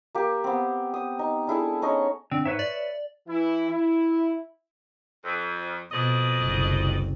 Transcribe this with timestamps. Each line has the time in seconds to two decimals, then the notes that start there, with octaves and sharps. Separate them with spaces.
0.15 A#3 G4
0.44 B3 C4
0.94 D#6
1.19 D#4
1.47 D4 E4 G#4 A4
1.82 C#4 D#4 C#5 D#5
2.31 D3 C4
2.45 G#2 B4 C#5 E5
2.59 D5
3.28 E3 E4
3.71 E4
5.23 F2
5.92 F2 B2 D5 D#5
6.42 F#1 C2